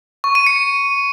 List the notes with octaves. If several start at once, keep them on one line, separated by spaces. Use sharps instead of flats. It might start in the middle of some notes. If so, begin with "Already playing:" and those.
C#6
D#7
C#7